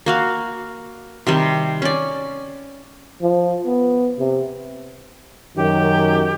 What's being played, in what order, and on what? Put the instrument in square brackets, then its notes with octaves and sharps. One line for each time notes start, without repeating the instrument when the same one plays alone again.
[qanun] A#3 F#4 F5
C3 D#3 G3
C#4 D5
[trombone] F3
B3
C3
[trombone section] F#2 [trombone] D#3 [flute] G4